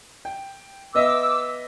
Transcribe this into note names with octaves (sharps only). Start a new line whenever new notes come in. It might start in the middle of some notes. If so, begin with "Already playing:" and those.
G5
B3 D#5 E5 D6 E6